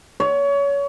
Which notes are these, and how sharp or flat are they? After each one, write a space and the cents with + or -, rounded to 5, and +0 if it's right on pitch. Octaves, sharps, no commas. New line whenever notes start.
C#5 +25